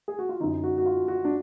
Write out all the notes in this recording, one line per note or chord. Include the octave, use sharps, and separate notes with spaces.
G#4
F#4
F4
F#2 D3 D#4
F#4
F#4
F4
F#4
D4